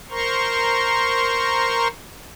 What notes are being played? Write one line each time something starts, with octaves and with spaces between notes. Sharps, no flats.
A#4 C5 A#5 C6 C#6